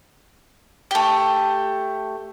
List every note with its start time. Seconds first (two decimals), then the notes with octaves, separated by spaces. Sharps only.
0.91 A3 G4